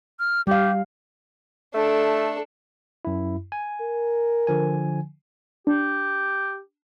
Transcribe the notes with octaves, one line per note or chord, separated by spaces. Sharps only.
F6
G3 G4 F5
A3 D4 A4
F#2 E4
G#5
A#4
D3 F3 G#5
D4 G4